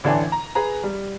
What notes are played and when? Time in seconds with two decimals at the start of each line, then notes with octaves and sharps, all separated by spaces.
0.04 A1 D3 E3 D4 G5 G#5
0.32 A#5
0.55 G#4 B4 A#5
0.83 G3